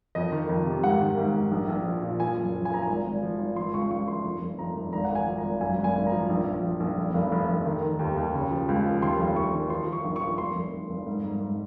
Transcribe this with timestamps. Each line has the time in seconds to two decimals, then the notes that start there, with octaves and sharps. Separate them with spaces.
0.15 F2 D#5
0.32 D#3
0.49 F2
0.66 C3
0.84 G#2 F#5
1.01 D#3
1.18 G#2
1.34 G#2
1.52 A#1
1.68 A#1
1.86 F3
2.02 A#2
2.20 F3 G#5
2.37 F#1
2.54 F3
2.65 G#5
2.71 F3 A#5
2.82 G#5
2.88 G#1
3.05 G#1
3.22 F3
3.39 G#1
3.56 F3 C6
3.74 C#2 C#6
3.90 C#2 C#6
4.07 F3 C6
4.24 F1 C6
4.41 F1
4.59 F2 A#5
4.76 F1
4.93 G#1 A#5
5.04 F#5
5.10 G#1
5.15 G#5
5.27 F3
5.38 A#5
5.43 G#1
5.61 F#2 G#5
5.79 G#1
5.84 G#5
5.95 G#1
6.07 A#5
6.12 F3
6.30 A#1
6.47 A#1
6.63 F3
6.80 A#1
6.98 F1
7.14 F1
7.32 F1
7.49 F1
7.66 D#3
7.83 D#3
7.99 D#2
8.17 D#2
8.34 C#3
8.51 F3
8.69 C#2
8.86 F3
9.02 D#2 C6
9.19 F1
9.36 F1 C#6
9.53 D#3
9.70 F3 C6
9.87 F3
9.93 C#6
10.05 A#1
10.16 C#6
10.22 F3
10.38 F1 C6
10.55 F1
10.73 F1
10.90 F1
11.07 G#2
11.24 G#2
11.41 G#2